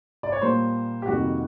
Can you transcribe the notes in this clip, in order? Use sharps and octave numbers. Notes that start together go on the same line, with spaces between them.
D5
C#5
A#2 G3 A#3 C5
G4
F2 C3 D#3 G3 A#3 F#4